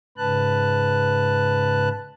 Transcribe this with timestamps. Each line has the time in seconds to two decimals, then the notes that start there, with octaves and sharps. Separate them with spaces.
0.18 G#2 C#3 B4 A5 F#6